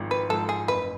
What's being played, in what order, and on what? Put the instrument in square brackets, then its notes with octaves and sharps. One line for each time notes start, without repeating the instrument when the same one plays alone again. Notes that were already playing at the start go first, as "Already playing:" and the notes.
Already playing: [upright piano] G#1 G#2 F3
[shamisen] B4
[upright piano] G#2 F3 [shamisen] A4
[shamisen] G#4
[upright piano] F#1 [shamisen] B4